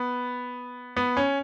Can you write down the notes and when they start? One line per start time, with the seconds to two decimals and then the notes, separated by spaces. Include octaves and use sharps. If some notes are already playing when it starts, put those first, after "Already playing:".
Already playing: B3
0.96 B3
1.17 C#4